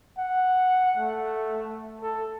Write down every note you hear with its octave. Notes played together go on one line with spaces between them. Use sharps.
F#5
A3
A4